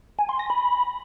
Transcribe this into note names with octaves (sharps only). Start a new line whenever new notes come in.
G#5
C6
A#6
B5